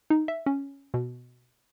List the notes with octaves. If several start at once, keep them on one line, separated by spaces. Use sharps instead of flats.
D#4
E5
C#4
B2